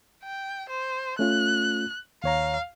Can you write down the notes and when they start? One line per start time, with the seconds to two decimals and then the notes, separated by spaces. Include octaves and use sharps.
0.24 G5
0.70 C5
1.19 A3 C#4 F4 F#6
2.24 D#2 C#5 F5 A#5